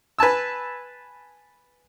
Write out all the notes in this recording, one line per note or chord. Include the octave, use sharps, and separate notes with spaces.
B4 G#5 A5 E6